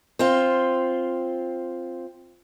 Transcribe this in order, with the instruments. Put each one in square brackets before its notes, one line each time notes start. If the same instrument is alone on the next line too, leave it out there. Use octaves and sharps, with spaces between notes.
[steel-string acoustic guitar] C4 F4